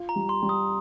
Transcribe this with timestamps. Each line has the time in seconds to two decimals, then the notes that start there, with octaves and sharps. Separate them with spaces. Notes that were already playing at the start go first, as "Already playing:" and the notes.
Already playing: F4
0.09 A#5
0.16 G3
0.29 C6
0.42 G3
0.49 D#6